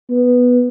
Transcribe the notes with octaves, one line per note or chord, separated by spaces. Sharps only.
B3